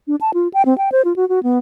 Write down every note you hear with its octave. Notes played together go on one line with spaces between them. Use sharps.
D4
A5
F4
G5
C4
G5
C5
F4
F#4
F#4
B3